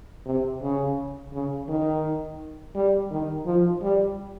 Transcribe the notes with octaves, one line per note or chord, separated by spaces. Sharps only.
C3
C#3
C#3
D#3
G3
D#3
F3
G3